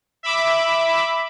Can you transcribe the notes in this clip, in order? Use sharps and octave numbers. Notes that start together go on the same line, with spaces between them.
E5 B5 D6 E6